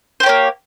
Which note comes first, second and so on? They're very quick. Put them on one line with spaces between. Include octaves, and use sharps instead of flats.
C5 G4 C#5 A#3